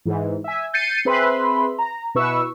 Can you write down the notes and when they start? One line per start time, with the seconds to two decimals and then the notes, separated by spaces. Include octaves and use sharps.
0.05 G#2 E3
0.44 E5 G#5
0.74 G6 A6 C7 C#7 D#7
1.05 C4 G#4 B4 E5 B5 C6
1.78 A#5
2.15 B2 E4 B4 C#6 E6